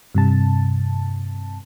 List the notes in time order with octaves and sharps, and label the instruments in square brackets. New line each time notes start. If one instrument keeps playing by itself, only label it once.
[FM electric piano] G2 C3 A5